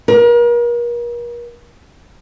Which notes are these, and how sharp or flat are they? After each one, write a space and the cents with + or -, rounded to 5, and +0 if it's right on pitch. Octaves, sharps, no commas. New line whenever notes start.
A#4 +40